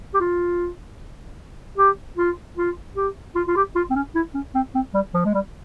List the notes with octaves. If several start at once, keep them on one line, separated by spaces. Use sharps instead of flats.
G4
F4
G4
F4
F4
G4
F4
F4
G4
F4
C4
C#4
E4
C#4
C4
C4
G3
F3
G#3
G3